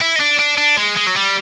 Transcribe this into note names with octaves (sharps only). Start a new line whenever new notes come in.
E4
D#4
D4
D4
D4
G#3
G#3
F#3
G3